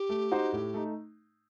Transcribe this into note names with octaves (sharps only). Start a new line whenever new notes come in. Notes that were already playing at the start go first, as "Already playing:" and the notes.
Already playing: G4
A3
D#4 F#4 C5
A2
A3 D#4